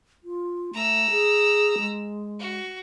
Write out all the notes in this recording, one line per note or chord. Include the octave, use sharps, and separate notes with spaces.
F4
A3 A#5 E6
G#4
G#3
F#4